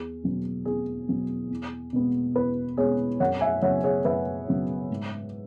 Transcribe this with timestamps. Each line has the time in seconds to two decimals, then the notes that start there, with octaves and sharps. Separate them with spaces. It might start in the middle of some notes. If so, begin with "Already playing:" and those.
Already playing: E2 G#4
0.23 B2 F#3 B3
0.65 E2 G#4
1.08 B2 F#3 B3
1.50 E2
1.93 B2 G#3 B3
2.35 E2 B4
2.77 B2 G#3 B3 G#4 C#5
3.20 F#2 C#5 F#5
3.41 E5 G#5
3.62 C#3 F#3 B3 C#5 F#5
3.84 G#4 C#5
4.05 F#2 B4 E5
4.48 C#3 F#3 B3
4.90 G#2